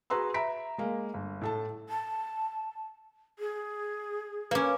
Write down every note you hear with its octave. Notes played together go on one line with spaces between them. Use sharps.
F#4 G#4 B4 A#5 C6 E6
E5 A#5 B5 B6 D7
G#3 A#3
G1
A2 A4 A5
A5
G#4
A#3 C#4 B4 D6